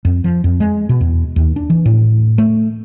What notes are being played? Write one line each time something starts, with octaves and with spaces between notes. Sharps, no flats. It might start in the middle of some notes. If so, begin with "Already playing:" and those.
F2
F3
F2
G#3
B2
E2
D#2
D4
E3
A2
A3